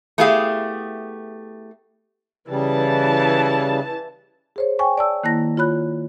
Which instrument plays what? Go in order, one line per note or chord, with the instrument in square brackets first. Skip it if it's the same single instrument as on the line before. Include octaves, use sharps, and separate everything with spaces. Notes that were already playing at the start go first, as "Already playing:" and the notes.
[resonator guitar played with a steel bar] A3 B3 E4 G4 G#4 F5
[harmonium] C#3 G3 [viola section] E3 A5
[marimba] G#4 C5 C#5
G5 G#5 C#6
D5 A5 E6
D#3 A#3 E4 A5 A#6
F4 C#5 B5 F#6